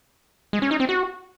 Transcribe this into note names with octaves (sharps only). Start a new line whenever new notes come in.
G#3
C#4
D#4
C4
F#4